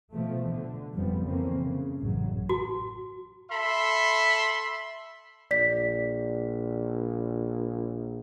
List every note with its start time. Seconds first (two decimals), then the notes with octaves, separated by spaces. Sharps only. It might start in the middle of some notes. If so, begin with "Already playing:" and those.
0.12 B2 F3 A3
0.49 D3
0.95 F#1 F2 F3 G3 B3
1.27 D3 E3 A#3 C4 C#4
1.59 C#3
2.00 A1 F#2 C#3 F#3
2.49 F#4
3.51 A4 E5 B5 C6
5.51 A#1 D5 B6